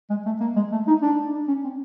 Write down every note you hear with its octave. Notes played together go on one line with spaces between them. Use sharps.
G#3
A3
A#3
G#3
A3
D#4
D4
D4
C#4
C4